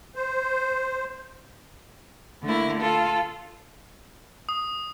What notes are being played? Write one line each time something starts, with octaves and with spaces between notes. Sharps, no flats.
C5
D3 A3 A#3 E4
F4 A4
D#6